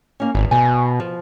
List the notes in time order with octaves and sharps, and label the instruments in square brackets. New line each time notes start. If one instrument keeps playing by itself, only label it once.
[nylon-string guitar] A#3 C#4
[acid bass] G#1 [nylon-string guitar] E2
[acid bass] B2 [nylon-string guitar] G#5
[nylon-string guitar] F3